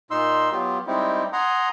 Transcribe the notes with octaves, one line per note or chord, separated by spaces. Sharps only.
A#2 D#4 C6 E6
F#3 B3 F4 G4
G3 G#3 C4 D#4 E4 G4
F#5 G#5 A#5 C6 D#6